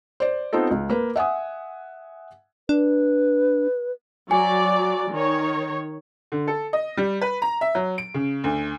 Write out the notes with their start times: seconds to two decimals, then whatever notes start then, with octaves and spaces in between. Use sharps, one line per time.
0.20 C5 D5
0.53 B3 C4 D#4 F4 A4
0.71 C#2
0.90 A#3 B4
1.16 E5 F#5 G#5 D#6
2.69 D4 B4
4.31 F#3 D5 G#5
5.12 D#3 C#5
6.32 D3
6.48 A4
6.73 D#5
6.97 G3
7.22 B4
7.42 A#5
7.61 E5
7.75 F#3
7.98 D7
8.14 C#3
8.44 D2